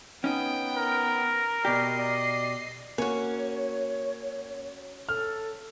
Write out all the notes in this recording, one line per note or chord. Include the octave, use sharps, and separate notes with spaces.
B3 C#4 D#4 G5
A#4
B2 G4 D5 D#5 C7
D5
A#3 C#4 F#4 C#5
A4 F6